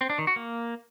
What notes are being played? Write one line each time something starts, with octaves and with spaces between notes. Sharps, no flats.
C4
D4
D#3
F#4
A#3